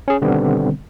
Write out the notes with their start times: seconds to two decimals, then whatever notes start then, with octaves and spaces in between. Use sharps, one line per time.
0.08 C#4 G#4
0.21 B2 D3 D#3 G3 B3 C4